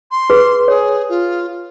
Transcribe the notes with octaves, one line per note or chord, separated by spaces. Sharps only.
C6
G#4 B4
G#4 C#5
F4